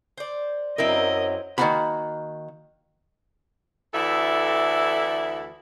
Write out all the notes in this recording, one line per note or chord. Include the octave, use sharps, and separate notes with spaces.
C5 D5
F#2 F#3 C4 E4 A#4 D#5
D#3 A#3 F4 F#4 F#5 B5
D2 E3 E4 A4 D5 E5